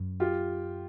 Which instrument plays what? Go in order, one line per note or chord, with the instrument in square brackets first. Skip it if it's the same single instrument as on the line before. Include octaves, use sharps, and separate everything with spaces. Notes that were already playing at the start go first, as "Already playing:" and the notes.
Already playing: [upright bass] F#2
[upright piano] F4 G4